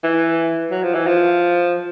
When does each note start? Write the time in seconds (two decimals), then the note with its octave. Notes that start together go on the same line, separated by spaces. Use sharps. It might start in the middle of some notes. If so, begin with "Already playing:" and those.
0.04 E3
0.71 F#3
0.83 F3
0.95 E3
1.07 F3